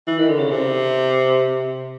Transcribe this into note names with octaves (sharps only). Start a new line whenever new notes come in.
E3
D#3
D3
C#3
C3